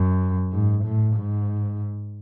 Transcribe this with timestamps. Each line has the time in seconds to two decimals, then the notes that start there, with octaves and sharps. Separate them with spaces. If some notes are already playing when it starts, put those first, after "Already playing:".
Already playing: F#2
0.53 G#2
0.85 A2
1.15 G#2